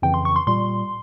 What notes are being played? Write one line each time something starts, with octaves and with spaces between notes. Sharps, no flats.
F2 C#3 E3 G5
C6
C#6
C6
A#2 G3 C6